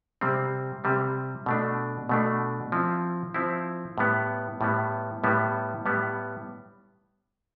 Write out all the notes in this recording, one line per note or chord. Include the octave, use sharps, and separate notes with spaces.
C3 G3 C4
C3 G3 C4
B2 A3 D4
B2 A3 D4
F3 C4 E4
F3 C4 E4
A2 G3 B3
A2 G3 B3
A2 G3 B3
A2 G3 B3